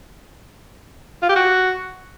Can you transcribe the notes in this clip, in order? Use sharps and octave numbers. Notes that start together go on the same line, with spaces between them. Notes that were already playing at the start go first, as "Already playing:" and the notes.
F4
G4
F#4